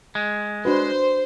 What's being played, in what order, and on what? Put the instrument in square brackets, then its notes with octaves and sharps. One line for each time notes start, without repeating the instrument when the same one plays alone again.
[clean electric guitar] G#3
[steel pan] D4 F#4 B4 [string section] C5